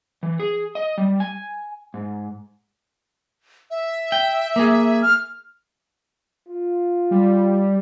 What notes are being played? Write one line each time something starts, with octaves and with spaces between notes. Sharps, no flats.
E3
G#4
D#5
G3
G#5
G#2
E5
G5
A#3 G#4
F6
F4
G3